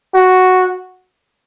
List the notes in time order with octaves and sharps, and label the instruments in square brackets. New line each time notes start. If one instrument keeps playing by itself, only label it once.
[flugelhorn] F#4